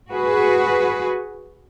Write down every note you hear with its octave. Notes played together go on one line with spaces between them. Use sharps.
F#4 G#4 B4